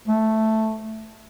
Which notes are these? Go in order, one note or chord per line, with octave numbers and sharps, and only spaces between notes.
A3